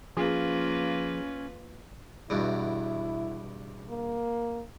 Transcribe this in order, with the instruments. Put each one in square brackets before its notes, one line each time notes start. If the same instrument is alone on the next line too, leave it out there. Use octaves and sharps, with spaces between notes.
[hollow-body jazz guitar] F3 [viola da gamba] A#3 F4 B4 [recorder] C#4 [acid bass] G#4
[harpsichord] E2 G2 B2 [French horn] E4
[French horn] A#3